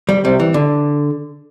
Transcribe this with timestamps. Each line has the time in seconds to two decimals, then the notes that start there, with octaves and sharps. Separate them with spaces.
0.09 G3
0.25 C3 G3
0.40 E3
0.54 D3